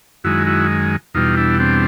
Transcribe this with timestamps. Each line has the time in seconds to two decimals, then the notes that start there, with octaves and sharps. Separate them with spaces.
0.24 F#2 D#3 G#3 E4 F#4
0.47 E4 F#4
1.14 E2 B2 G3 D#4 F4
1.37 D4 E4
1.60 C4 D4